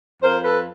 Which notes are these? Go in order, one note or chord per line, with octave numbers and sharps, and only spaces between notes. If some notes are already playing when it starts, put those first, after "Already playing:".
F2 A#4 C5
A4 B4